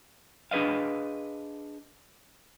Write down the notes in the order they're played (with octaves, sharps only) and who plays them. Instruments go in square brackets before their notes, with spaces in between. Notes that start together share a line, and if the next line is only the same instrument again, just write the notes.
[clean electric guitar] D4 G#4 B4 D#5 F5